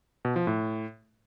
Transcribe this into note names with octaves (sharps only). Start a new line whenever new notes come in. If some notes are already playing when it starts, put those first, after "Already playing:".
B2
F3
A2